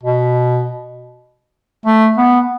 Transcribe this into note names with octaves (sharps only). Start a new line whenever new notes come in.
B2
A3
B3